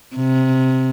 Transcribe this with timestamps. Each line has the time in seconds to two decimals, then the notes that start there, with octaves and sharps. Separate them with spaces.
0.16 C3